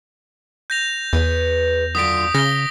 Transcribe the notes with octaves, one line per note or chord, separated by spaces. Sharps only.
G6 A#6 F7
E2 G#4 B4 C#5
F#2 D3 F4 D#6 B6 D7
C#3 F5 A#6 G7